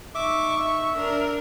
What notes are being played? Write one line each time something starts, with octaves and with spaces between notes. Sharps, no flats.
D#4 E5 C#6 D6
E5
D4 A#4